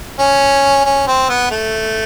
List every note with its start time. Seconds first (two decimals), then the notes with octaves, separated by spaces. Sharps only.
0.19 C#4
0.85 C#4
1.08 C4
1.29 B3
1.51 A3